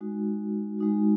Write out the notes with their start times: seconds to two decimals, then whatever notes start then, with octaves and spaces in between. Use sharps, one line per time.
0.01 G#3 D#4 F#4
0.78 G#3 D#4 F#4